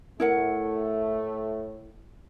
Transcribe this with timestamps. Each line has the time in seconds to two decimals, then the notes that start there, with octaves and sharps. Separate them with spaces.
0.20 A2 A3 E4 A#4 F#5